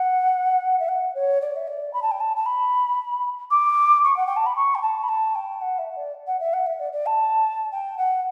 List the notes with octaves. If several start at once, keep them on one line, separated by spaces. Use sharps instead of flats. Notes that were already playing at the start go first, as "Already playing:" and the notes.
Already playing: F#5
E5
F#5
C#5
D5
E5
D5
B5
A5
G5
A5
A5
B5
D6
C#6
F#5
G5
A5
B5
C#6
G5
A5
B5
A5
G5
F#5
E5
D5
F#5
E5
F#5
E5
D5
D5
A5
G5
F#5